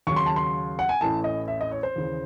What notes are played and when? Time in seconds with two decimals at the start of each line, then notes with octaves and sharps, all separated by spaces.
0.07 D#2 C#3 F#3 C#6
0.16 C6
0.26 A5
0.36 C6
0.79 F#5
0.89 G#5
1.01 A1 A2 E3 A5
1.24 D#5
1.48 E5
1.61 D#5
1.71 C#5
1.83 C5
1.96 D#2 C#3 E3